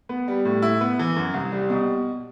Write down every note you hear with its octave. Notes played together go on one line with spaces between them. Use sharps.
B3
G3
A2
E4
B3
E3
F#2
C2
G3
B2